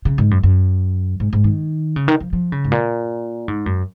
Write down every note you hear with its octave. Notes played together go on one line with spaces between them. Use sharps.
C#3
G#2
F#2
F#2
G#2
G#2
D#3
C#3
D#3
F3
F3
C#3
G#2
A#2
G#2
F#2